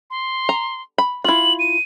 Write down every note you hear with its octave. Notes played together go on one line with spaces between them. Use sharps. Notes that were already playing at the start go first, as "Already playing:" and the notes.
C6
A#5
B5
E4 F4 F#7
D#7